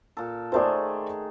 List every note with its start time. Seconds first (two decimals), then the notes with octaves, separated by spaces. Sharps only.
0.17 A#2 A4
0.52 D#3 A3 G#4 C5 D5